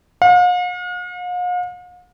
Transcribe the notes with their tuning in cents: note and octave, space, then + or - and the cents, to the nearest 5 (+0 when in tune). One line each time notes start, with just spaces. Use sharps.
F5 +45